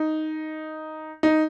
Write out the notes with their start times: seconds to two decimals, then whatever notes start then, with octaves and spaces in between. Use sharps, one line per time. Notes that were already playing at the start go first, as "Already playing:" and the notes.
Already playing: D#4
1.23 D#4